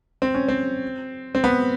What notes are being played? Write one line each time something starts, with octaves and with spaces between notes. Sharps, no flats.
C4
C#4
C4
C4
B3